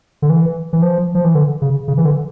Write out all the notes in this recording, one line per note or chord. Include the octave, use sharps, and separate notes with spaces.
D3
E3
E3
F3
F3
E3
D3
C#3
C#3
E3
D3